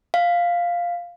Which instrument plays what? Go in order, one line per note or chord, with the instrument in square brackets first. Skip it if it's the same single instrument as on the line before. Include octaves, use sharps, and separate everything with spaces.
[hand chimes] F5